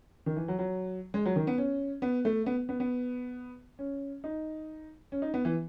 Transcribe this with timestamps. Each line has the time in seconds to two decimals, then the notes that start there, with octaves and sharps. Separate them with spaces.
0.26 D#3
0.37 E3
0.48 F#3
0.59 F#3
1.14 G#3
1.26 F#3
1.36 D#3
1.47 B3
1.58 C#4
2.02 B3
2.25 A3
2.46 B3
2.69 B3
2.80 B3
3.79 C#4
4.24 D#4
5.12 C#4
5.22 D#4
5.34 B3
5.45 E3